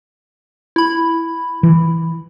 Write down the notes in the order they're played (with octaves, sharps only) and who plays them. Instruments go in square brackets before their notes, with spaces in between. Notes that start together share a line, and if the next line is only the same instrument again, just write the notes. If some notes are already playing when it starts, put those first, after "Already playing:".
[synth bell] E4 B5
[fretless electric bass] E3